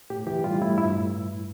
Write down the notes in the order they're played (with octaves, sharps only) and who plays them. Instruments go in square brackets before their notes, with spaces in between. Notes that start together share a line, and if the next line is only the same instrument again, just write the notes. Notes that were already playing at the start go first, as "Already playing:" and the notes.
[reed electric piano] A2 G4
E3 G4
G3 F4
A2 E4
G2 E4